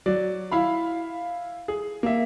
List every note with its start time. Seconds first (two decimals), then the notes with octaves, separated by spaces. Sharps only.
0.06 F#3 D5
0.52 E4 F5 B5
1.68 G#4
2.03 A#3 E5